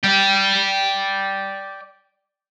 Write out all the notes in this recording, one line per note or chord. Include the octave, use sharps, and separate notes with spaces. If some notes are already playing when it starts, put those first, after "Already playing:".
D5 G5